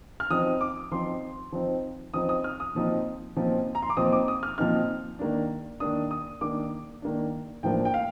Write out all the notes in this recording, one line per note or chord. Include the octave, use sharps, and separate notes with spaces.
F6
F3 C4 D#4 D#6
D6
F3 C4 D#4 C6
F3 C4 D#4
F3 C4 D#4 D#6
D#6
F6
D#6
A#2 F3 C4 D#4
A#2 F3 C4 D#4
A#5
C6
D6
A#2 F3 C4 D#4 D#6
D6
D#6
F6
A#2 F3 C4 D#4 F6
D#3 A#3 D4
D#3 A#3 D4 D#6
D#6
D#3 A#3 D4 D6
D#3 A#3 D4
A2 F3 A#3 D4 G5
G5
F5